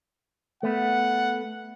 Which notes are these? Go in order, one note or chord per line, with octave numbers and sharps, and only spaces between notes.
A3 B3 F#5